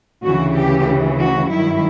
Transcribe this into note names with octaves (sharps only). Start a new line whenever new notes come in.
D2 C#3 E3 F#4
G4
F#4
G2 D#3 F#3 E4